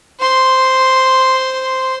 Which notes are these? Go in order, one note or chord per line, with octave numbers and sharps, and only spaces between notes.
C5 C6